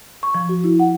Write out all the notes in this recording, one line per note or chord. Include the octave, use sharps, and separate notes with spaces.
C#6
F3
F#4
E4
F#5